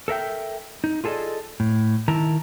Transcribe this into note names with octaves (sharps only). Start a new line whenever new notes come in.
A4 A#4 E5 G5
D#4
F4 G#4 A4 C5 D5 D#5
A2
D#3 E4 A#4 A5 A#5